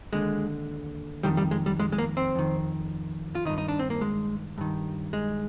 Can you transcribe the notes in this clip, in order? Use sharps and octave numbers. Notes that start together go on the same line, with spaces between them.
D#2 D3 G#3
F2 D#3 G3
G3
G#3
G3
G#3
G#3
A#3
C4
F2 D#3
F4
G2 D#3 D#4
D#4
D4
C4
A#3
G#3
G2 D#3
G#3